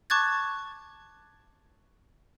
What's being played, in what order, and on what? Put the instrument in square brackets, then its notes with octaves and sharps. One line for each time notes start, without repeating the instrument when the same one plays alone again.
[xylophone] A5 C#6 D6 F#6 G#6 A6